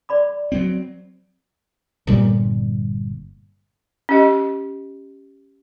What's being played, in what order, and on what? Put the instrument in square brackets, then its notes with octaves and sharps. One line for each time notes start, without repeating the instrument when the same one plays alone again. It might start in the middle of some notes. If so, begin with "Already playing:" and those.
[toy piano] D5 B5 D6
[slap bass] F#3 C4
[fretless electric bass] G1 A#2 G3
[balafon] C#4 G4 D#5